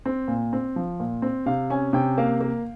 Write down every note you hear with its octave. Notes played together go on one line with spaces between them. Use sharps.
C4
A#2
C4
F3
A#2
C4
C3 F5
C#4 G#5
C3 G5
A#3 F5
A#3